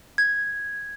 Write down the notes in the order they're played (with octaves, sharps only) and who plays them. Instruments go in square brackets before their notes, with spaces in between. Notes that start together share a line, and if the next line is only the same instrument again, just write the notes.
[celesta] G#6